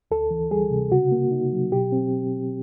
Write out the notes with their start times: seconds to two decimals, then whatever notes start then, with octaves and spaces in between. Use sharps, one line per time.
0.11 D2 A4
0.31 E3
0.51 G3 G#4
0.71 C3
0.92 C#3 F#4
1.12 A#3
1.31 D#4
1.52 F#3
1.72 B2 G4
1.92 C4